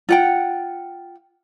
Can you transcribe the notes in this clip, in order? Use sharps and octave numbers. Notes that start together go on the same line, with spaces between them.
F4 F#5 G5